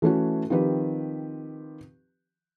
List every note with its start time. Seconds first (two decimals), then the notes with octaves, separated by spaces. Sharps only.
0.02 E3 A3 C#4 F#4
0.50 D#3 F3 C4 G4 B4